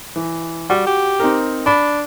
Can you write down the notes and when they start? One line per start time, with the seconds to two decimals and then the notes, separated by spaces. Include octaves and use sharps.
0.16 E3
0.70 G3 F#4
0.87 G4
1.20 C4 D#4 A#4
1.66 D4 B5